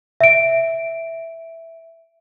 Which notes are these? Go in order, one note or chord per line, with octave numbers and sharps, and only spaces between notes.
E5 D7